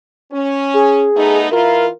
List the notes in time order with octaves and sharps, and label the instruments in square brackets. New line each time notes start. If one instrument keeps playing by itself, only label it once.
[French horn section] C#4
[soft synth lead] G#4
[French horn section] A3 B3 D#4
[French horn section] E3 E4 F4 [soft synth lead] A#4